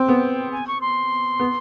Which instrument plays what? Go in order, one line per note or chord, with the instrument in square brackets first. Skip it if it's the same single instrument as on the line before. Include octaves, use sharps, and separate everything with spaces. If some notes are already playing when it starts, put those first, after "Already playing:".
Already playing: [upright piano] C4 [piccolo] G5
[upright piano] B3
[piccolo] G#5
C#6
C6
[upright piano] B3